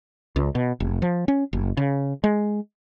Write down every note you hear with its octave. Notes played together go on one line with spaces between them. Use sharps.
C#2
B2
F1
F3
C#4
F#1
C#3
G#3